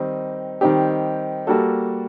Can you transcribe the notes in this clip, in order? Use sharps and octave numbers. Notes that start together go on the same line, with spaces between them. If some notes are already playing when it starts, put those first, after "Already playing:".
Already playing: D#3 G3 C4 D#4 G4
D#3 G3 C4 D#4 G4
G3 A#3 F#4 A4